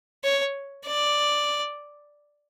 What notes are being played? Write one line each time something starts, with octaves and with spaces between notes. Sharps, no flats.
C#5
D5